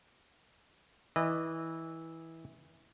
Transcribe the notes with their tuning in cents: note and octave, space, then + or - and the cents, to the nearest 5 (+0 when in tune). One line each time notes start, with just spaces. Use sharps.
E3 -15 D#5 -30